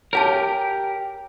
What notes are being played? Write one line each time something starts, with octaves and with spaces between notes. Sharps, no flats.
G4 A#4 C#5 G#5 A5